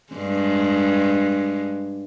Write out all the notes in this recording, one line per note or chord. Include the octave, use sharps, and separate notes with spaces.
G2 G#3